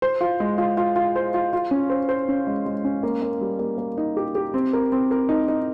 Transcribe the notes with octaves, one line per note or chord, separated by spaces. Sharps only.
C5
F4
G#3
F4
F4
F4
C5
F4
F4
C#4
C5
C5
C#4
G#3
G#3
C#4
A#3
A#3
G3
A#3
A#3
D#4
G4
G4
C4
A#4
C4
A#4
D#4
D#4